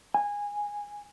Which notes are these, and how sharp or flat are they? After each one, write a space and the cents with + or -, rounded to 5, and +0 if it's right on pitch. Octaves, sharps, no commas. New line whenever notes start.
G#5 -15